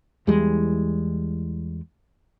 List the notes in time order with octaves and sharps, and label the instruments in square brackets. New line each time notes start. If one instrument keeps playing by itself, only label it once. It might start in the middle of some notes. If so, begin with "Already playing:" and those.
[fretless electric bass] E2 E3 G3 G#3